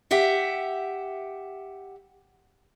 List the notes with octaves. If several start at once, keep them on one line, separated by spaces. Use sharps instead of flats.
G4 E5 F#5